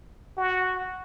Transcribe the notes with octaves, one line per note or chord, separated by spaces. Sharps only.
F#4